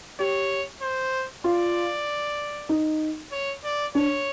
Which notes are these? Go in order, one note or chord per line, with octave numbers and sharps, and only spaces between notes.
G4 C#5
C5
F4 D5
D#4
C#5
D5
D4 C#5